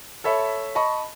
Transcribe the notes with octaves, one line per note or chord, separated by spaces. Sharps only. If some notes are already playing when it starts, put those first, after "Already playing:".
A4 C#5 E5 B5
D#5 A5 B5 C#6